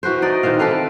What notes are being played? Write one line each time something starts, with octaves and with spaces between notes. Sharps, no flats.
E3 F#4 B4 C5
D#4 D5 D#5
D#3 E3 C4 F5
C4 A4 B4 F5